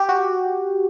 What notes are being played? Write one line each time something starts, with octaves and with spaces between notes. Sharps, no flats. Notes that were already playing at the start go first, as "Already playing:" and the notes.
Already playing: G4
F#4